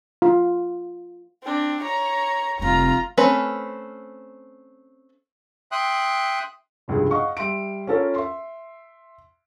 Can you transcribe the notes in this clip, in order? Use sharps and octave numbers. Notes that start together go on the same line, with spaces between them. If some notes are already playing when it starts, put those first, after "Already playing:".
F4
C4 D4
C#5 A#5
F1 G3 F4 A#5
A3 C4 C#4 B4
E5 G5 C6 D#6 F#6
F1 C#2 G2 G#4
D#5 F5 F#5 C#6
G3 E5 C6 D7
C#4 F4 A4 A#4 C#5
E5 C6